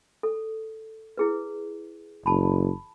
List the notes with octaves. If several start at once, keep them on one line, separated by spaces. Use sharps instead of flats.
A4
E4 G#4 B4
F#1 A5 B5